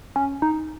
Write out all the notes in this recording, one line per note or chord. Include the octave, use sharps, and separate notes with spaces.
C#4
D#4